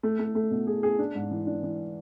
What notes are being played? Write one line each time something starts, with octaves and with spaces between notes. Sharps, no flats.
A3
A3
A3
B2
G#4
G#4
D4
G#2
E3
D4
E3